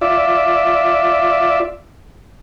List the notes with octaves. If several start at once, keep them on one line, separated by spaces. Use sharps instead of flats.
F4 D5 E5